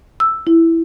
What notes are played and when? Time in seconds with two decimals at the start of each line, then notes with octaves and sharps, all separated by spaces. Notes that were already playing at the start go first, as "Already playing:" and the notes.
0.20 E6
0.47 E4